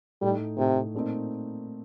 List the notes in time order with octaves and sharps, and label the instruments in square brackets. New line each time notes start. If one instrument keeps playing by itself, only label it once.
[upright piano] A2 A3 D#4 [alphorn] G3
[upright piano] A2 A3 D#4 [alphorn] C3
[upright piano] A#2 A3 C4 D#4